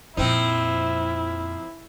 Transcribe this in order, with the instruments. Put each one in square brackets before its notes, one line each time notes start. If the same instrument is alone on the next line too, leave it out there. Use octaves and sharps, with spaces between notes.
[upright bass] F2 A#2 [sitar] F3 C4 D#4 [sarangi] E4